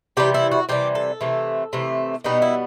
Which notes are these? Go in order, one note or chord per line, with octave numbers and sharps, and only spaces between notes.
C3 E3 G3 G4
E4
F#4
C3 E3 G3 G4
A4
C3 E3 A3
C3 E3 A3
B2 G3 B3 D#4
E4